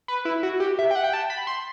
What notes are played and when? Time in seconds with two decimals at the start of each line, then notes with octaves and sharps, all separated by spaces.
0.08 B4
0.25 E4
0.43 F#4
0.60 G4
0.79 E5
0.91 G5
0.95 F#5
1.04 G5
1.13 A5
1.30 B5
1.47 C6